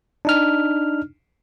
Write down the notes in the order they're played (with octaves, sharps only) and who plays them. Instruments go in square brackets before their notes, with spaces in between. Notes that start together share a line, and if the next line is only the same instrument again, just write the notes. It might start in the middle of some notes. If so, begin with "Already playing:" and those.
[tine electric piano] D4 D#4 F6